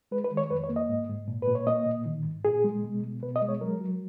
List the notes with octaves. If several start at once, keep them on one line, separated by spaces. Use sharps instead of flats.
G#3 B4
B4
D#3
C#5
F2 B4
C#5
A#3
D#5
G#2
G#2
A#2
B4
A#2
C#5
A#3 D#5
A#2
D#3
G#2
A#2 G#4
G#3
B2
B2
B2 B4
D#5
G#3
C#5
F#3 A#4
F#3